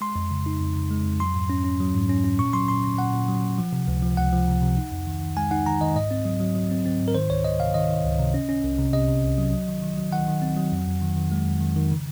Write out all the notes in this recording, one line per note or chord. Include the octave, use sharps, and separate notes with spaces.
G#3 C6
F2
C#3
D#4
F2
C#3
G#3
F2
F#3 C6
G#2
C#4
C#4
F#3
G#2
C#4
C#4
A#2 C#6
F#3 C6
A#2 C6
C#4
A#2 F#5
A#2
F#3
A#2
F3
C3
C#2
F3
C#2 F#5
F3
C3
C3
D#4
F2
D#3
D#3
G#3 G#5
D#4 F#5
D#3 A#5
D#3 D#5
G#2 D#5
C4
F#3
F#3
F#3
C4
C4
G#2
A#4
D#3 C5
C#2 C#5
D#3 D#5
C3 F5
D#3 D#5
D#3
C#2
C3
C#4
C#4
C2
C3
C3 D#5
C3
C2
F#3
F#3
D#3
D#3
F#3
D#3 F#5
D#3
C4
F#3
F2
F2
D#3
D#3
G#3
F2
D#3
D#3
C#3